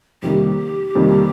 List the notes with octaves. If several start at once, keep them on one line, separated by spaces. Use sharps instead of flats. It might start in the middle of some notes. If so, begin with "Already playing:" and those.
F2 C3 D#3 G3 A#3 G4
F2 C3 D#3 G3 A#3